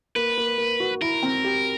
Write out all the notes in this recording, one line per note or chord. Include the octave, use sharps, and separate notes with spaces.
A#3 B4
A#3
A#3
F#4
E4 A#4
C4
G4